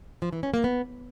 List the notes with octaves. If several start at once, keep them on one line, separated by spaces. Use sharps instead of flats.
F3
E3
C#4
A#3
B3